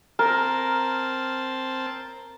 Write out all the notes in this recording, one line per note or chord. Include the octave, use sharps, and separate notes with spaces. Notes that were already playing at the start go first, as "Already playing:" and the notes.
C4 A#4 A5